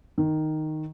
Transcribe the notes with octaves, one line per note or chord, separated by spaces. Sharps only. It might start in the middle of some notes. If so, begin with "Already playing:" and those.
D#3